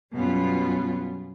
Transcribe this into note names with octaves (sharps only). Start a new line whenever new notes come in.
F#2 B2 G3 B3 C#4 F4